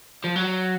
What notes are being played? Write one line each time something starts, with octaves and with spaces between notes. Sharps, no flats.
F3
F#3